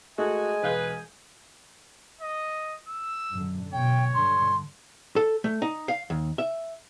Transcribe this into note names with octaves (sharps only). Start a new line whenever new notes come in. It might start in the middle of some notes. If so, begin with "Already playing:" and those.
G#3 A3 F#4 D#5 G#5
E1 B4 F5 G6
D#5
E6
F#2 D3
B2 C#5 G5
G2 D3 C6
A4
A3
D#4
F5
D#2
E5